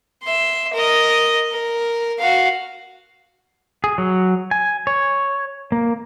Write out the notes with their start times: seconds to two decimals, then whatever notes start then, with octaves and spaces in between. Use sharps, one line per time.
0.23 E5 C6
0.74 A#4 D#5
1.51 A#4
2.19 F#4 F5
3.84 G#4
3.98 F#3
4.51 G#5
4.87 C#5
5.72 A#3